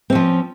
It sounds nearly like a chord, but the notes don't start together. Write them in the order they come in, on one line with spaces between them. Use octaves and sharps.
C4 C#4 F3